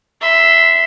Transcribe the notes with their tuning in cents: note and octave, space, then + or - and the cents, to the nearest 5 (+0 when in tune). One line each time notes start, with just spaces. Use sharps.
E5 +0 C6 -25